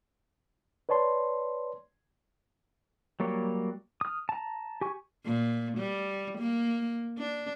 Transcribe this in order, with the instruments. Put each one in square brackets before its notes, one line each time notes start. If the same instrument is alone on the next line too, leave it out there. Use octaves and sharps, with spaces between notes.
[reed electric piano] B4 C#5 D5 A5 C6
[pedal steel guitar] F#3 G3 A#3 C#5
D#6 F6
A5 A#5
G4 G#5 C#6
[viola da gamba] A#2
G3
A#3
D4